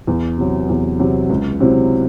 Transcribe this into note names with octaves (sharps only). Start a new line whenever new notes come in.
E2
C3 F#3
E2
C3 F#3
C#2
C3 F#3 C4 E4